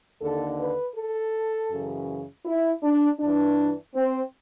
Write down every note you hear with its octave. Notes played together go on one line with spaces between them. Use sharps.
D#2 D3 A4
B4
A4
F#2 C#3 E3
E4
D4
G2 E3 D4
C4